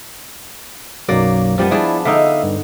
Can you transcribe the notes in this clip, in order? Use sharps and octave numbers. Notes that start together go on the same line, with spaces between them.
B1 F#2 F#3 A#3 D5
F#2 F3 G3 B3 G4
D4 E4 G#4 D5
D3 D#4 E5 F5 D#6
G2